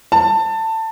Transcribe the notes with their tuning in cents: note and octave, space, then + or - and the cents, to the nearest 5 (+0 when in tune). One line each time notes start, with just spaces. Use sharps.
A5 +20